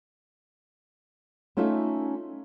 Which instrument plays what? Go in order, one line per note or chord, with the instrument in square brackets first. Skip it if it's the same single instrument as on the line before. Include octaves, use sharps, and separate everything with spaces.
[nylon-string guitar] A3 C#4 D#4 F4 E5